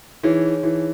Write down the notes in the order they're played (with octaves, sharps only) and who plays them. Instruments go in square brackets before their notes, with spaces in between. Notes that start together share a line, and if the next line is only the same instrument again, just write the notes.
[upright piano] E3 [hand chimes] D#4 G#4 C#5
[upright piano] E3